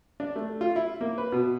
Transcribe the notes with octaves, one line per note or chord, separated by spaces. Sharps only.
D4
A3
F4
E4
A#3
B4
B2